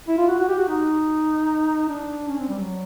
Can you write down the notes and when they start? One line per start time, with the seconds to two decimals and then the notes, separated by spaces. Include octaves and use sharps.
0.08 E4
0.17 F4
0.28 F#4
0.38 F#4
0.48 G4
0.58 F#4
0.69 D#4
1.88 D4
2.28 C#4
2.38 C4
2.49 G3
2.58 F#3